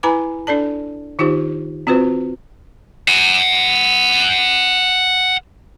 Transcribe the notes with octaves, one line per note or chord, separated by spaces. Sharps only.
E4 B4 G#5 A#5 B5 D6
D4 A4 D5 A5
D#3 D#4 F4 G4 C5
C4 F4 F#4 B4 C5
F#5 G#5